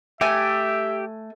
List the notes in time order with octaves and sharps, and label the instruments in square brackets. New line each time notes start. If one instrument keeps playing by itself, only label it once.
[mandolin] A3 G#5 [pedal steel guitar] G4 [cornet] E5